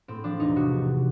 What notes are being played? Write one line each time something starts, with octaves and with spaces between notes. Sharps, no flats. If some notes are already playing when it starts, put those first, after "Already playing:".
A2 C4
F3 D4
E1 D#4
C3 F#4